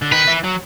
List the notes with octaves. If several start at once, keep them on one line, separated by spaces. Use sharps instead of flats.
D3
D#3 B4
E3
F#3